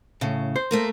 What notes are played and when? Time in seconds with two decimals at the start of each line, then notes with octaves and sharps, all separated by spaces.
0.21 A2 C#3
0.56 C5
0.71 A3 A#3 A#4